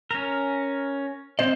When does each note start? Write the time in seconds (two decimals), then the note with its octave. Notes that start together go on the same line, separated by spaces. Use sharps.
0.11 C#4 A#4
1.39 C4 C5 D#5